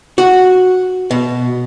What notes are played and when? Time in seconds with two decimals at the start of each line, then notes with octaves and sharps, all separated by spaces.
0.18 F#4
1.11 B2